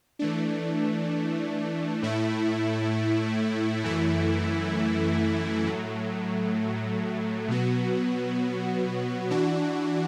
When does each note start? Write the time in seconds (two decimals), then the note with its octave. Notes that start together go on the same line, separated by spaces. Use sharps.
0.19 E3 A3 D4
2.02 A2 A3 E4
3.84 F#2 E3 A3 E4
5.66 A2 F#3 A3
7.48 B2 F#3 B3 F#4
9.31 E3 D4 F#4